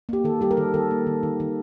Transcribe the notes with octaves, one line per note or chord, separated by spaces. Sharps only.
A#3 G4
D#3 A4
G3 G4
A#4
D#3 A4
D#3 A4
A#3
D#3
D#3
D#3